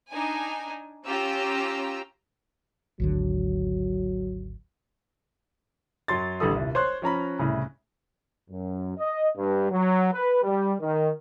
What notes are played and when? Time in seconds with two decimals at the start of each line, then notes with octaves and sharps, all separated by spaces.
0.11 D4 D#4 G#5
1.06 C#4 F4 G4 A#5 E6
3.00 G#1 D2 D3 F#3
6.08 F#2 F#3 C6 A6
6.40 A1 D3 G3 A4 D#6
6.55 D#1 C2
6.75 C5 C#5 C6 F#6
7.02 F3 C#4 A#5 B5
7.39 C2 A2 C#3
8.50 F#2
8.97 D#5
9.36 G2
9.71 F#3
10.12 B4
10.43 G3
10.81 D#3